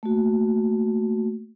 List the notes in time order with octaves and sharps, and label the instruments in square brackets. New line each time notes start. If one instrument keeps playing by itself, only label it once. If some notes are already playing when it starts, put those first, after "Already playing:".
[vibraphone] A3 A#3 F#4